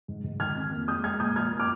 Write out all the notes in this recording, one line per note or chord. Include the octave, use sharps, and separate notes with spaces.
G#2
G#2
D#3 F6 G#6
F2
A#3
G#3 D#6 G6
G#3 F6 G#6
A#2 D#6 G6
F3 F6 G#6
A#3
D6 F6